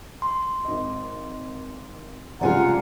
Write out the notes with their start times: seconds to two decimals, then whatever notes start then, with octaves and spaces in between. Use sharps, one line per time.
0.22 C6
0.65 G#1 D#5
2.41 F1 C#2 G3 F4 G#4 D5 F#5 A#5